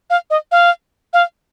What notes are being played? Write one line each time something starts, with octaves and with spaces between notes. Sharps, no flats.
F5
D#5
F5
F5